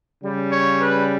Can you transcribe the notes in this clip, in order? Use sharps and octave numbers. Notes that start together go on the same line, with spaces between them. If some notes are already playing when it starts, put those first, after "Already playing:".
C#3 G3
C#5
B4